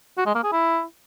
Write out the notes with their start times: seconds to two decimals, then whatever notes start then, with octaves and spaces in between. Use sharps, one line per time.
0.17 F#4
0.26 G#3
0.35 A#3
0.43 G#4
0.52 E4